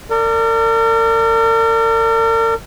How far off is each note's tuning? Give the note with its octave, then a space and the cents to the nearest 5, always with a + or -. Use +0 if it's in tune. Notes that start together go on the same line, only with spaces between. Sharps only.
A#4 -40 D5 +0